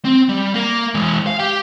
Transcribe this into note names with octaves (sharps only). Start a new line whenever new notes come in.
C4
G3
A#3 A#4
E3 G#3
F5
G4 G5